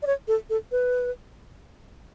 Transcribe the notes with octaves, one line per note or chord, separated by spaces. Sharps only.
D5
C#5
A4
A4
B4